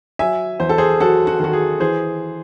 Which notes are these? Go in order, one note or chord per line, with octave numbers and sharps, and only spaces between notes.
F#3 E5 G#5
E2 C5
A4
G#4 C5
F#3 F#4 A4
F#4
D#3 F#4
G#4
E3 G#4 C5